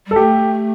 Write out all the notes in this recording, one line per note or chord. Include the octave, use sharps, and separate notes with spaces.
G3 A4
A3 G4